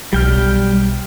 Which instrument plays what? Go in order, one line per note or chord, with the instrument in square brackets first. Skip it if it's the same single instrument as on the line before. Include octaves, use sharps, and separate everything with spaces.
[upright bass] B1 [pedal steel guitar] G3 G5 F6